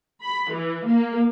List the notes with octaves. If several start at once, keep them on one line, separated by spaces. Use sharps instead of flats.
B5
E3
A#3